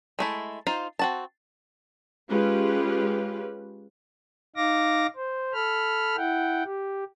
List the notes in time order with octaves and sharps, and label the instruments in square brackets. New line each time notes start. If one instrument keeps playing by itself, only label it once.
[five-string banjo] G#3 A3 E4
D#4 F4 C5
C4 F#4 A5
[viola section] G#3 C#4 F4 G4 B4
[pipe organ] D#4 F5 D6 A#6
C5
A4 B5 F6
E4 F#5 G5
G4